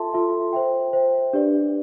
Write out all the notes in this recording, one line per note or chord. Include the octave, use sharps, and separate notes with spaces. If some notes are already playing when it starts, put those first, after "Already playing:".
Already playing: F4 A4 E5 A5 C6
F4 A4 E5 A5 C6
C5 E5 G5
C5 E5 G5
D4 G4 B4 D5